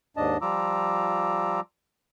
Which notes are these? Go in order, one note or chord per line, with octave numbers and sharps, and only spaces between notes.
D#2 G#2 D4 D#5 A5
F3 G3 F4 A#5 D6 E6